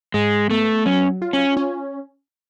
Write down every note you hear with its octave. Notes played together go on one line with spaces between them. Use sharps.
G#2 G#3
A3 B3
F#3 C#4
F4
C#4
C#4